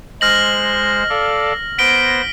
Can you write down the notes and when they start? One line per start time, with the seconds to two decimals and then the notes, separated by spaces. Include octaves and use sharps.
0.21 G#3 C5 F6 A#6 F#7
1.10 A4 D5 F5
1.78 B3 C5 A#6 B6 D7 G7